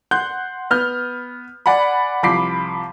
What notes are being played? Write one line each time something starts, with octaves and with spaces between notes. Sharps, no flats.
F#5 C6 F#6 G6
B3 F6 G6
D5 F#5 G#5 B5
C2 F3 B5 D6 B6 C7